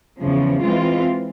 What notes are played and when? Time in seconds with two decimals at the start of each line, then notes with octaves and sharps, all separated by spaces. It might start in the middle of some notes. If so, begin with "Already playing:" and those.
0.22 E2 C#3 F3
0.63 E3 G#3 C4 F4